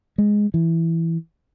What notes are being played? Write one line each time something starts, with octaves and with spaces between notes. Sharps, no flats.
G#3
E3